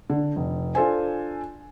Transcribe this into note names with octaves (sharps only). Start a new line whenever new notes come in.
D3
F1
D4 F4 A4 C5 G#5